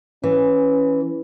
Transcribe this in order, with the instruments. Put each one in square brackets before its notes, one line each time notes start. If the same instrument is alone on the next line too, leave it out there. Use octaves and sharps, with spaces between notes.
[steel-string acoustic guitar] E3 [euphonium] C#4